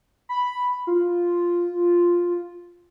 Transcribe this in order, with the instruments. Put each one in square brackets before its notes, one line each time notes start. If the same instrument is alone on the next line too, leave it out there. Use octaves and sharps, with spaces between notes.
[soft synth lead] B5
F4